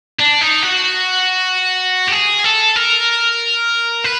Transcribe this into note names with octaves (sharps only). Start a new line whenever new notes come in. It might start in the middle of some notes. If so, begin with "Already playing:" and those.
D4
D#4
F#4
G4
G#4
A4
A#4
B4